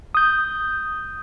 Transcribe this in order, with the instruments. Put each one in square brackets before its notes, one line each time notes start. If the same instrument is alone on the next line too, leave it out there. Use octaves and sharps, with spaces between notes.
[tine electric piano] D#6 G6